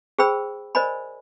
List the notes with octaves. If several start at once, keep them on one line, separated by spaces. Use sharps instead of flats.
G#4 C5 G5 B5 E6
A#4 C5 D5 D#5 G#5 B5